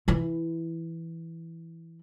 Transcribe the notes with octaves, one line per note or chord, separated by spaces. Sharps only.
E3 E4